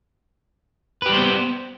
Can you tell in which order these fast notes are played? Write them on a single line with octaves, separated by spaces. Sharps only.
B4 G4 G3 C5 B3